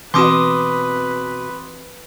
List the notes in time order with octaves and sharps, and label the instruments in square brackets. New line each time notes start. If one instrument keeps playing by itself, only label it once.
[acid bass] B2 [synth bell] E3 C4 F#4 [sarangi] B4 [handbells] C6 D6 D#6